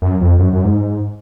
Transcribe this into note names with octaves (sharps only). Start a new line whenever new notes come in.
F#2
F2
F#2
F#2
G#2